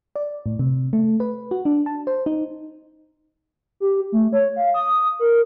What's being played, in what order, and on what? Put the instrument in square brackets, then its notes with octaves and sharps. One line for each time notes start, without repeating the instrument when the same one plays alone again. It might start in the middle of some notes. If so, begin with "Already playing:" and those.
[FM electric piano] D5
A2
C3
A3
B4
F#4
D4
A5
C5
D#4
[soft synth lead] G4
A3
C#5
F5
D#6
A#4